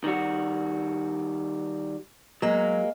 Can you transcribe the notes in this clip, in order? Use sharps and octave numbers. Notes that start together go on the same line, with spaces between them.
D#3 G3 F#4
F#3 G#3 A#3